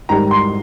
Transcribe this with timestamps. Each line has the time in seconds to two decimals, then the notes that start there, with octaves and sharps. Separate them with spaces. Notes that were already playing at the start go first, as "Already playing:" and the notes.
0.09 G#2 D#3 G3 A#5
0.31 C6